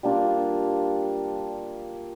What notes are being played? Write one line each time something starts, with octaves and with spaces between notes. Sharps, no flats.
G3 A#3 D4 F4